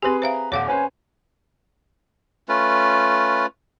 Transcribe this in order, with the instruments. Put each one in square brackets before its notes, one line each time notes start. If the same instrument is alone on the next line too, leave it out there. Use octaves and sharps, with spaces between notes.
[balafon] C4 G4 [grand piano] G#4 B4 [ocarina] C6
[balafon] C5 E5 F5 [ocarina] A#5
[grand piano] D#1 [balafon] C#5 F5 F#5 [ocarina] D6
[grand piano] C#4 B4 C5 [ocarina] G#5
[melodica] A3 C#4 F4 B4